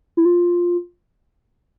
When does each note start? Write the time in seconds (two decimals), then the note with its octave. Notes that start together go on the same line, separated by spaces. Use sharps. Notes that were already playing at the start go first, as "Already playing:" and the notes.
0.17 E4
0.25 F4